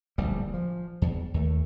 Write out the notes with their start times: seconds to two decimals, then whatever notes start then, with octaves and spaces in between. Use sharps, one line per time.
0.18 D1 A#1 G3
0.54 F3
1.02 E2
1.34 D#2 A3